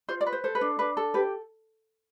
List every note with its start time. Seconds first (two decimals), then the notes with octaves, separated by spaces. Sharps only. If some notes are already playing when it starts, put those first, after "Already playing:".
0.09 F4 C5
0.21 D5
0.26 B4
0.33 C5
0.44 A4 C5
0.55 B4
0.61 D4
0.79 D4 B4
0.97 A4
1.14 G4 B4